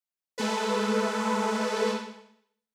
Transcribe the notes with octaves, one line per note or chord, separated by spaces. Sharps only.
G#3 A3 A4 B4